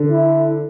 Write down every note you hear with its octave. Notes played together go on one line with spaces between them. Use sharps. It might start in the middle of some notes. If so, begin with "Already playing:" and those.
Already playing: D3
E4